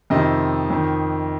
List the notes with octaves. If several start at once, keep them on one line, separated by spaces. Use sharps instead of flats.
F2 C3 D#3 D#5
F2 D#3